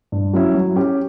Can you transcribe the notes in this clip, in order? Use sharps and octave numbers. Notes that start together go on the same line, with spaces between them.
G2
F#3 C#4 E4
F#3
C#4 G4